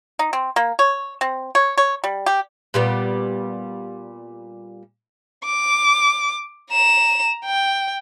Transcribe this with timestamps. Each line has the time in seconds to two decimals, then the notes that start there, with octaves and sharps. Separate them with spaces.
0.19 D#4
0.33 C4
0.56 A#3
0.79 C#5
1.21 C4
1.55 C#5
1.78 C#5
2.04 G3
2.26 G4
2.74 A#2 G3 B3
5.46 D6
6.71 A#5 E7
7.45 G5